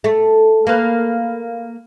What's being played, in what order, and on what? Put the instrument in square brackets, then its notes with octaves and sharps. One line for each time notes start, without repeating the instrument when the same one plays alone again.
[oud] A3
A#3 B4